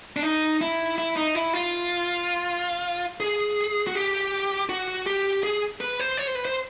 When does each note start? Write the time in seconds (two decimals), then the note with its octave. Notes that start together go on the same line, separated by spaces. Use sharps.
0.16 D4
0.23 D#4
0.61 E4
0.98 E4
1.16 D#4
1.35 E4
1.53 F4
3.20 G#4
3.87 F#4
3.95 G4
4.69 F#4
5.06 G4
5.43 G#4
5.81 B4
5.99 C5
6.18 C#5
6.27 C5
6.35 B4
6.45 C5